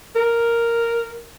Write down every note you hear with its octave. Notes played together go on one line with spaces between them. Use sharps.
A#4